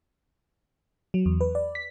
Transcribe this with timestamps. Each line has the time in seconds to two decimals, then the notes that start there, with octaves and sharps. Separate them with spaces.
1.14 F#3
1.26 E2
1.41 B4
1.55 D5
1.75 B6